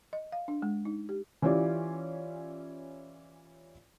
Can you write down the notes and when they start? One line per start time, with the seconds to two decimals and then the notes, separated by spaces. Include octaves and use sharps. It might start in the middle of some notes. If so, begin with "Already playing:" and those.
0.13 D#5
0.32 F5
0.48 D4
0.62 G#3
0.85 D#4
1.09 G4
1.42 E3 C#4 F4 G4 D5